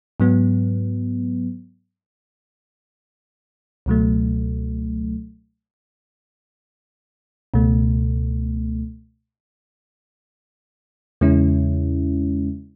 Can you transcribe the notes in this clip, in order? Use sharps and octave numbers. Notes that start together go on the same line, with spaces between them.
G#2 F#3 B3
C#2 B2 F#3 A3
C#2 B2 A3
E2 C#3 G#3 C#4 E4